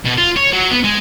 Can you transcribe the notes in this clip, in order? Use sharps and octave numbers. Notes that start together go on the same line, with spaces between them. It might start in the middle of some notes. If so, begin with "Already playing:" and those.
B2
F4
C#5
F#3
B3
G#3